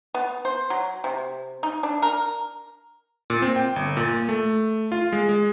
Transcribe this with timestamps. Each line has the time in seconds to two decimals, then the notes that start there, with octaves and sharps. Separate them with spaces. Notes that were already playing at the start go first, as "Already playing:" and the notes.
0.14 B3
0.45 C5
0.70 F#3
1.04 C3
1.63 D#4
1.83 D4
2.02 A#4
3.30 A#2
3.42 C4
3.56 G5
3.76 G1
3.97 A#2
4.29 A3
4.92 F4
5.13 G#3
5.29 G#3